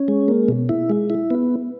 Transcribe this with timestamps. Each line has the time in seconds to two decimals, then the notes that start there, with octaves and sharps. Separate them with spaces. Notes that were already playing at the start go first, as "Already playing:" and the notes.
Already playing: C#4
0.08 G#3
0.28 A#3
0.48 B2
0.69 E4
0.90 G#3
1.10 E4
1.30 B3